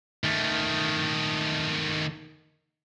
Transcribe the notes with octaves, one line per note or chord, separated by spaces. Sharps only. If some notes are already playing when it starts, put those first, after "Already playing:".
D#3 A3